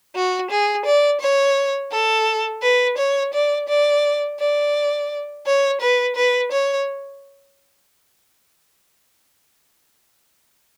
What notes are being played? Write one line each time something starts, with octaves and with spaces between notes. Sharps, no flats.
F#4
G#4
D5
C#5
A4
B4
C#5
D5
D5
D5
C#5
B4
B4
C#5